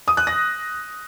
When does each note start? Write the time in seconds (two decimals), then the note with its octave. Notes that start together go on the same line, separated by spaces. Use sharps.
0.08 D#6
0.17 F#6
0.27 A#6